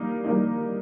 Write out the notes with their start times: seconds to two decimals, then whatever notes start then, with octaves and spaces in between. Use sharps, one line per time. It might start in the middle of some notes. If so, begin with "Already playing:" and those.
Already playing: G3 A#3 D#4
0.24 G3 A#3 D#4